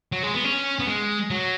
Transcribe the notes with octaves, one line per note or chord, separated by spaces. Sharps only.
F#3
G#3
B3
C#4
B3
G#3
F#3